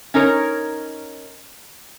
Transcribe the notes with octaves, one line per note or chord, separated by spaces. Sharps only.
C#4 D#4 A#4 C#5